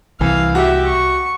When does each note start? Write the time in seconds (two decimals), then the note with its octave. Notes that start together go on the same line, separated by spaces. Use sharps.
0.21 C2 E3 F5
0.55 F#4 G4 E5
0.87 C#6